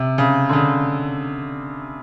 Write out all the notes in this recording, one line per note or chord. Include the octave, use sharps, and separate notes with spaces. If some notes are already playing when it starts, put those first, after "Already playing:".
Already playing: C3
C#3
D3
C#3